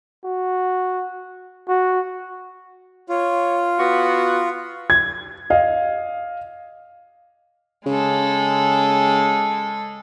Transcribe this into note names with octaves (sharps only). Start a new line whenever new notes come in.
F#4
F#4
F4 C#5
B3 F#4
G#6
D#5 F5
C#3 G#3 A4